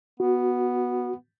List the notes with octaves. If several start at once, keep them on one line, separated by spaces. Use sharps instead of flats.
B3 F#4